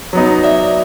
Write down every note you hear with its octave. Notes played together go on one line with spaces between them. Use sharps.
F#3 B3 D#4
D5 E5